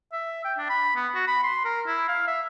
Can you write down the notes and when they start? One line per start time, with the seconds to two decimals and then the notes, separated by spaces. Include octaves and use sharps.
0.12 E5
0.44 G5
0.58 D4
0.70 B5
0.96 B3
1.15 F#4
1.27 B5
1.43 C6
1.65 A#4
1.87 E4
2.08 F5
2.27 E5